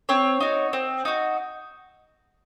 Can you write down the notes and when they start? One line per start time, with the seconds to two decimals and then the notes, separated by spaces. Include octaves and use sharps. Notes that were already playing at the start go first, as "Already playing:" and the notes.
0.09 C4 C#5
0.41 D#4 F#4
0.73 C4
1.05 D#4 F#4